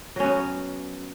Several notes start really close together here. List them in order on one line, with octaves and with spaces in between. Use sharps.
F#3 C#4 B3